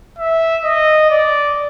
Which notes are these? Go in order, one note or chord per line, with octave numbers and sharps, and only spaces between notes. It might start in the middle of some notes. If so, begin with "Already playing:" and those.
E5
D#5
D5